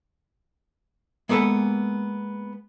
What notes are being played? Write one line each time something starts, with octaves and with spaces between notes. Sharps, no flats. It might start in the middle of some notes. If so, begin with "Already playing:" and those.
G#3 A#3 B3 A4 B4